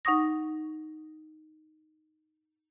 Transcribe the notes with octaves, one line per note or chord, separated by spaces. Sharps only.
D#4 F#5 C#6 D#6 A#6